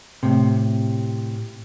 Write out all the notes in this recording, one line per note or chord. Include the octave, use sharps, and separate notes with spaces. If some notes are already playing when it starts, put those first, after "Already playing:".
A2 C3